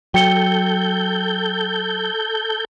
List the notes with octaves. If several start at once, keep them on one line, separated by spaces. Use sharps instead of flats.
F#3 A4 G5 G6 C#7 G7